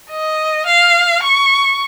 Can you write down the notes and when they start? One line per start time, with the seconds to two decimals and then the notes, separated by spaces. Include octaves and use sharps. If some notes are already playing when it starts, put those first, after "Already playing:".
0.11 D#5
0.66 F5
1.23 C#6